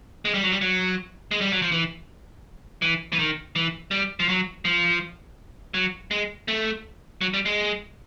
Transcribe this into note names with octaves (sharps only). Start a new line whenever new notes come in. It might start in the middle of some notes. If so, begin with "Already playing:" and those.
G#3
G3
F#3
G3
F#3
G#3
G3
F#3
F3
E3
E3
E3
D#3
E3
G3
F3
F#3
F3
F#3
G#3
A3
F#3
G3
G#3